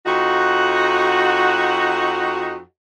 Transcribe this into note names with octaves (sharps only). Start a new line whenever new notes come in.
F2 D#4 F#4